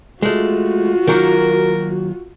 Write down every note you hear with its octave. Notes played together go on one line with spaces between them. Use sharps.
G#3 A3 F4 F#4
D#3 F#3 A#3 A#4